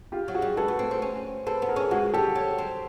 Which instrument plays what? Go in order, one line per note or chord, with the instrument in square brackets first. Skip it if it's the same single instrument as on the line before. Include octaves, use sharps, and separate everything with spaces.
[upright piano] F4 G4
[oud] F#3
[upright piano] F#4 G#4
[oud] G3
[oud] G#3 [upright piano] A4 B4
[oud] A3
C4
C4
C#4
[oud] C4 [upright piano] A4 B4
[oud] B3
[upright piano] G#4 A#4
[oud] C#4
[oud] G#3 [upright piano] F#4 G#4
[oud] G3 [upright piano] G4 A4
[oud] F#3
C4